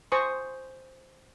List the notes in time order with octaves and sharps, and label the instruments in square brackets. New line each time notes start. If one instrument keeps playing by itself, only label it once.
[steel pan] C5 G#5 C#6 D#6